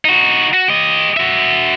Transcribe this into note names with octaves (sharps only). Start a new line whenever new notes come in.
D#4 F#4
F#4
G4 D#5
F#4 E5